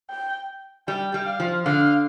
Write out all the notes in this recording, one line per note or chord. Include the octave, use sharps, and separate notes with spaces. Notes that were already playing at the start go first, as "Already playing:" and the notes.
G5
G3 G5
G3
F5
F3
D3 F5